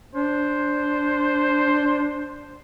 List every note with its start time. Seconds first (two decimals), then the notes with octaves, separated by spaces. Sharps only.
0.15 D4 C5